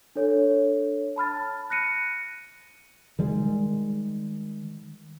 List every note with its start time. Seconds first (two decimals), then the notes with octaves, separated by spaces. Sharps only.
0.16 D4 A4 C#5
1.16 A5 B5 F6 A6
1.70 F#6 A#6 C#7 D#7
3.19 D#3 G3 G#3